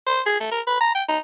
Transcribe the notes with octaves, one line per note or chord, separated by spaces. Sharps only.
C5
G#4
A3
A#4
B4
A#5
G5
D#4